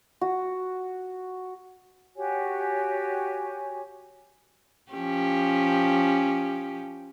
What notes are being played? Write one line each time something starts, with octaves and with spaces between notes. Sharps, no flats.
F#4
F#4 G4 C#5 G#5
F3 C#4 G4